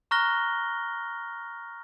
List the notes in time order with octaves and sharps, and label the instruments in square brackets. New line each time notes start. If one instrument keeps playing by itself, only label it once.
[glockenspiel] A#5 C#6 F6 F#6 A#6 G7